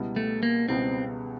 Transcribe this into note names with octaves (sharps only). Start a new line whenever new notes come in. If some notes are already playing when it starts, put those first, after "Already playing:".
Already playing: C#2 B2 G3 B3 E4
A3
A#3
C#2 B2 G3 B3 C4 E4